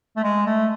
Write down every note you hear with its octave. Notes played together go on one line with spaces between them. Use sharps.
A3
G#3
A3